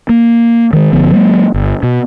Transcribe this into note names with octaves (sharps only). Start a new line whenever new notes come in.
A#3
D#3 G#3
G1 D3 F3 B3
F#3 G#3 A#3
G1
B2